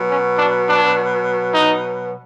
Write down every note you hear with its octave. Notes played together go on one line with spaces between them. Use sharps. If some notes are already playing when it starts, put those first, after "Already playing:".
Already playing: B2 F#3
C#4
D4
D4
D#4